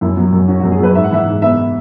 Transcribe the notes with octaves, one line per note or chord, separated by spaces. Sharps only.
F#2 E4
F#3
F#2
C#4 F#4
F#2 F#4
G#4
F#3 B4
G#2 E5
F#5
E3 E5
G#2
B3 E5